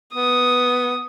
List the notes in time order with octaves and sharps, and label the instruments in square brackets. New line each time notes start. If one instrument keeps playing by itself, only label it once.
[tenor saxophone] B3 [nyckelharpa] D#6